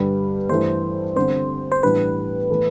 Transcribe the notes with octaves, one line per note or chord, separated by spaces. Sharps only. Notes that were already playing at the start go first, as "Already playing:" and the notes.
Already playing: G2 D3 G3 B4
G2 E3 A3 E4 C5
D3 G3 C4 C5
C5
A2 E3 G3 D4 B4
A2 E3 A3